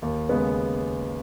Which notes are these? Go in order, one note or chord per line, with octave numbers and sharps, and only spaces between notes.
D#2
C#3 G#3 B3